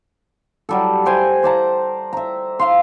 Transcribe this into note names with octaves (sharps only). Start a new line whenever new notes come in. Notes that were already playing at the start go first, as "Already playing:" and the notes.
F#3 G3 A4
G4 C5 G5 G#5
C5 D5 A5 A#5
E5 A#5
E5 F5 C6